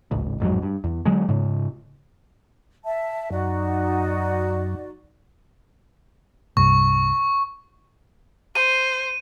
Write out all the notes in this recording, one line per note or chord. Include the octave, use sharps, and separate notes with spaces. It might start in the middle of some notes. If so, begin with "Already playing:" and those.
D1 G#1 C#2
A1 F2 G#2 F#3
G2
E2
D3 F#3 G#3
G#2 C#3
E5 A5
F#2 D#4 F#4 D5
C2 G2 C#6
C5 D#7